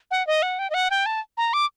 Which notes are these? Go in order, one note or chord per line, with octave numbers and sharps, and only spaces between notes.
F#5
D#5
F#5
G5
D#5
F#5
G5
A5
A#5
D6